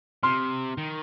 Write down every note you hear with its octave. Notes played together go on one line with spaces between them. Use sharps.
C3 C6 F6
D#3